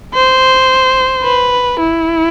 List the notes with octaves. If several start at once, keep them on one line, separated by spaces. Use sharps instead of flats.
C5
B4
E4